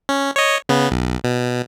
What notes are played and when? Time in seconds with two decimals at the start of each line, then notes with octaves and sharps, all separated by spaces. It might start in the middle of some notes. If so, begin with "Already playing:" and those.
0.09 C#4
0.36 C#5 D#5
0.69 C#3 B3
0.91 B1
1.24 B2